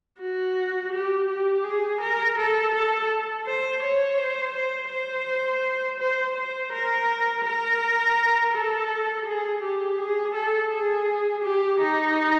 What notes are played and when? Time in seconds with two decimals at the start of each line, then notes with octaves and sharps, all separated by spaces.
0.20 F#4
0.93 G4
1.29 G4
1.64 G#4
2.01 A#4
2.38 A4
2.74 A4
3.46 C5
3.82 C#5
4.18 C5
4.55 C5
4.91 C5
6.00 C5
6.36 C5
6.73 A#4
7.45 A#4
8.54 A4
9.25 G#4
9.62 G4
9.98 G#4
10.35 A4
10.71 G#4
11.43 G4
11.80 D#4